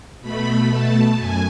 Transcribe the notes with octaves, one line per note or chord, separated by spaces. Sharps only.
B2 A3 B5
A5
F#2 G#5